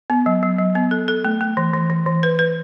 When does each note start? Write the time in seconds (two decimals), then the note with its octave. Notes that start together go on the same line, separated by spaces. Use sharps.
0.10 B3
0.26 F#3
0.43 F#3
0.59 F#3
0.75 B3
0.91 A4
1.08 A4
1.25 A3
1.41 A3
1.57 E3
1.74 E3
1.90 E3
2.06 E3
2.23 B4
2.39 B4